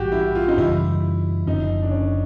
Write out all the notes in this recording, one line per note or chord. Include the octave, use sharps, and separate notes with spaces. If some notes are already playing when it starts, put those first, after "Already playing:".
Already playing: A#1 G#2 E3 G3 F#4 G4
E4
F4
D#4
F#2 C#3 E3 G3 E4
F#1 F#2 D3 F3 D#4
D4
C#4